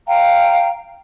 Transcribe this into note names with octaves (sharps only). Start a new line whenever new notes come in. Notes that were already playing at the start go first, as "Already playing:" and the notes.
F5 G5 A#5